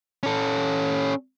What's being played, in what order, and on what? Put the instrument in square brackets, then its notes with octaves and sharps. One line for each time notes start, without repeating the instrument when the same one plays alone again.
[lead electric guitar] C#4 A4